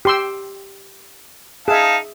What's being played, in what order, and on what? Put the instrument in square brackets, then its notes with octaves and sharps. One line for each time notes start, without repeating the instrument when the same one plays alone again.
[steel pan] G4 C6 E6
[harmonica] D#4 F5 A5 [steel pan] G#4 E5